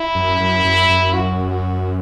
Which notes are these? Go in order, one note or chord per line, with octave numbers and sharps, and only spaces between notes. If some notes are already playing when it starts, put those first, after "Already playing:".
Already playing: E4
F#2
F#2
F#2
F#2
F#4
F#4